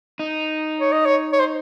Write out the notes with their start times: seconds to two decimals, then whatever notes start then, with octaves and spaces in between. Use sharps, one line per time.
0.19 D#4
0.80 C#5
0.92 D#5
1.05 C#5
1.33 C#5
1.40 C5